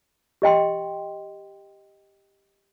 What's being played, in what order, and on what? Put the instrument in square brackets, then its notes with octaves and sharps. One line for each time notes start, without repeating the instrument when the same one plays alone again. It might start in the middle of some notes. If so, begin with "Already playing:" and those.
[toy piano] G4 D#5 G5 C6